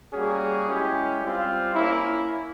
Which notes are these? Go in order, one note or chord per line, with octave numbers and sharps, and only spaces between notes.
G3 A#3 C#4 F#4 G#4
G#3 C#4 E4 G4
G3 C4 F4
A#3 C#4 E4